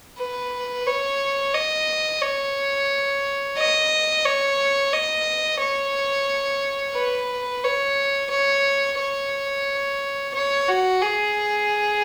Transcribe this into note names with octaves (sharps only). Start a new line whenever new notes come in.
B4
C#5
D#5
C#5
D#5
C#5
D#5
C#5
B4
C#5
C#5
C#5
C#5
F#4
G#4